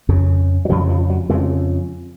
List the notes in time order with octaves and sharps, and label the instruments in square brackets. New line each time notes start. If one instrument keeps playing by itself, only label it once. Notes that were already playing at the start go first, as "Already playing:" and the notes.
[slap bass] F2 C#3
F#3
F2 C#3 F3
F3
F#3
F2 C#3 G#3